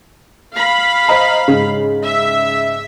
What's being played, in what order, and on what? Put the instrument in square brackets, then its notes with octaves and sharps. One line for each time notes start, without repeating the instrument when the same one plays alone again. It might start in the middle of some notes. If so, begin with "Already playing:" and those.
[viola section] F5 B5
[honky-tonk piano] C5 D#5 A#5
G#2 C#3
[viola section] E5